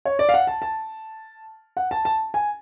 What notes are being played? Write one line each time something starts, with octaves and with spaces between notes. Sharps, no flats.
C#5
D5
F5
F#5
A5
A5
F#5
A5
A5
G#5